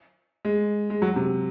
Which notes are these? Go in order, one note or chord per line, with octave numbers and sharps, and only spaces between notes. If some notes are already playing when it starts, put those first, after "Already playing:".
G#3
G#3
F#3
C3